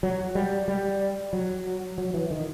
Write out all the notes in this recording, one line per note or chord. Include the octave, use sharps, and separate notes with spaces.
F#3
G3
G3
F#3
F#3
E3
D#3